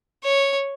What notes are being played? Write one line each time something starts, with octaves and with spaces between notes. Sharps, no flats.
C#5